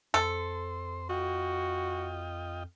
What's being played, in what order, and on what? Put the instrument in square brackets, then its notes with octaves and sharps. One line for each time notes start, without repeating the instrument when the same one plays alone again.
[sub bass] F2 [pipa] A4 [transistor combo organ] C5
[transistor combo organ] F4 D#5 G5 [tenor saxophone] F#4